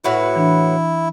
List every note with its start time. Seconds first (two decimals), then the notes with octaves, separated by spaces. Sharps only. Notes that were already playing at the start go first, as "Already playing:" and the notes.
0.04 A2 E4 F#4 B4
0.36 E3 D4